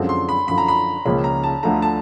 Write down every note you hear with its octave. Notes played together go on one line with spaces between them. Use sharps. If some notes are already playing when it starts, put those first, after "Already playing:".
Already playing: F#2 D3 F3 G#3 C4
C6
B5
F#2 D3 F3 B5
A#5
B5
C#2 C#3 F3 A#3 C#4 B5
A#5
A5
D2 D3 F3 A3 A#5
A5